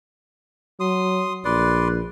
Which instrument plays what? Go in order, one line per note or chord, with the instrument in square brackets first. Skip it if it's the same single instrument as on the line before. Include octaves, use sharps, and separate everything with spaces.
[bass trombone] F#3 [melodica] C6 D#6
[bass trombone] A#1 [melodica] B4 D5 C6